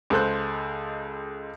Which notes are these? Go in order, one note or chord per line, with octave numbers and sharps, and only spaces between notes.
C#2 G#3 A4 C5 F#6